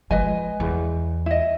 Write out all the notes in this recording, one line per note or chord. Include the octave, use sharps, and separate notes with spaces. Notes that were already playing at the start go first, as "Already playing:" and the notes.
F3 G#3 B4 D#5 G#5
E2
E4 D#5